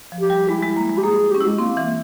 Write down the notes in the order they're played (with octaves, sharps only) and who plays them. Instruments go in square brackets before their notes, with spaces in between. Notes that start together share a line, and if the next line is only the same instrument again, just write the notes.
[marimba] F3
[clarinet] G4
[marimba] G3
[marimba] G#3 [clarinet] E4
[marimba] G#3
A#3
G#3
[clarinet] G4
[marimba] A#3 [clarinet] G#4
[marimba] C#4 [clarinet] G4
[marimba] E4
[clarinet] G#3
[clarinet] A#3 [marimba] C4
[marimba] E3